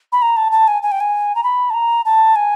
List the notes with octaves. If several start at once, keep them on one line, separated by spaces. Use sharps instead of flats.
B5
A#5
A5
A5
G#5
G#5
G5
G#5
A#5
B5
A5
A#5
A5
G#5